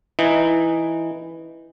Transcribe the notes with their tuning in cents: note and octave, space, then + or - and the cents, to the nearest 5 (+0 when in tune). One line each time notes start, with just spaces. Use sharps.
E3 +0 D#4 +0